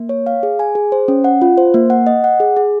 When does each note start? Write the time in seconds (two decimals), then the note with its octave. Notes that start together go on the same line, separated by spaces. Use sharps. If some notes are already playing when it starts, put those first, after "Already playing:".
Already playing: A#3
0.09 C#5
0.26 F5
0.43 G#4
0.59 G#5
0.75 G#4
0.92 C5
1.08 C#4
1.24 F#5
1.42 F4
1.58 C5
1.74 A#3
1.90 F#5
2.07 D#5
2.24 F#5
2.40 G#4
2.57 G#4